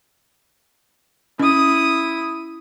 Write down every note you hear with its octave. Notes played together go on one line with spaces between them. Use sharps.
C#4 E4 D#6